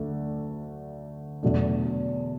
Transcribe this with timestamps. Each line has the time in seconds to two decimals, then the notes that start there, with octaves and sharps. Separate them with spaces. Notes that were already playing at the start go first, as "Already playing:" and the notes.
Already playing: D2 D3 A3 D4
1.43 E2 B2 F#3 A3 D4